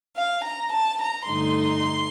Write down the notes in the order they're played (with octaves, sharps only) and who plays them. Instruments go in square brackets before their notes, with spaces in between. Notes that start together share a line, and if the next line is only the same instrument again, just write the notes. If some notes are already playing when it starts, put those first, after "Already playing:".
[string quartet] F5
A#5
A5
A#5
G2 D3 A3 D#4 C6